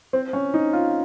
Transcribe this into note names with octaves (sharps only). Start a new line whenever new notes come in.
C4
C#4
D#4
F4